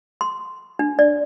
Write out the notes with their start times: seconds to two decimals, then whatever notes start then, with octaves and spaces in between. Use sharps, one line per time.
0.21 C6
0.79 D4
0.99 D5